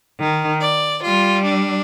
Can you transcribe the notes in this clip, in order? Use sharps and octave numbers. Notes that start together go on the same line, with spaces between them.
D#3
D5
G3 F4
D4